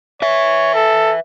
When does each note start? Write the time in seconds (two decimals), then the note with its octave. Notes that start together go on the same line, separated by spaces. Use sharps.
0.22 B4 C#5 E5
0.74 A4